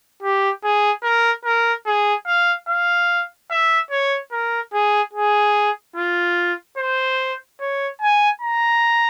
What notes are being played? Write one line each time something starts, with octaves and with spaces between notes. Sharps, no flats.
G4
G#4
A#4
A#4
G#4
F5
F5
E5
C#5
A#4
G#4
G#4
F4
C5
C#5
G#5
A#5